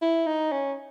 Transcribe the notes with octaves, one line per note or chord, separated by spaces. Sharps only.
E4
D#4
C#4